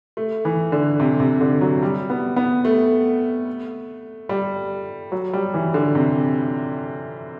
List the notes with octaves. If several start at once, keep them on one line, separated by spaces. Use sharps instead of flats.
A3
E3
D3
C3
C3
D3
F#3
G3
B3
B3
A3
G3
F#3
G3
E3
D3
C3